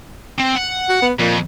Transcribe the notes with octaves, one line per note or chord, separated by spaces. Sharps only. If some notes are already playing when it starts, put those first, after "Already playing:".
C4
F#5
F#4
B3
F2 A#2